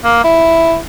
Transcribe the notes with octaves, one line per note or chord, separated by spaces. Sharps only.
A#3
E4